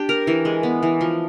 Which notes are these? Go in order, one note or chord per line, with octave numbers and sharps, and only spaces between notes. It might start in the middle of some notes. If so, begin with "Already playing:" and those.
Already playing: D4 G4
A#4
E3
G#3
B3
E3
F3